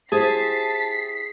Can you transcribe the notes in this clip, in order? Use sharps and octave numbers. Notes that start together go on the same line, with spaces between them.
E4 G4 G#4 C5 A5 B6 C7